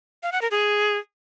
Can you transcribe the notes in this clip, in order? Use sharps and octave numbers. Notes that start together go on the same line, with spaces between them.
F5
F#5
A#4
G#4